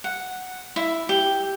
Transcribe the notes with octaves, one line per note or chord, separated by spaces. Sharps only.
F#5
E4
G4